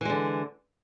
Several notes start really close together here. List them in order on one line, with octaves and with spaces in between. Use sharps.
E3 G#3 D3